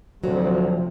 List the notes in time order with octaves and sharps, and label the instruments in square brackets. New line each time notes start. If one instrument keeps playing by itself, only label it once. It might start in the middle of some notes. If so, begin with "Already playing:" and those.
[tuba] D2 [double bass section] C3 F3 [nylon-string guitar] F#3